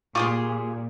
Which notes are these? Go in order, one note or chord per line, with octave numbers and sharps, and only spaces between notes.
A#2 F4 G4 G#4 C6 C#6